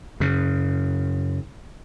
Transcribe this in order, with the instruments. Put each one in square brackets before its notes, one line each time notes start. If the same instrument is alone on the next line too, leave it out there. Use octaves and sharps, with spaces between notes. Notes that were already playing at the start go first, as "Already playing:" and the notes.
[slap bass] F#2 C#3